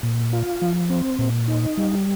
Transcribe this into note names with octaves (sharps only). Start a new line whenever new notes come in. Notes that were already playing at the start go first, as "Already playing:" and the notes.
A#2
F4
F3
C4
A#2
D#4
G3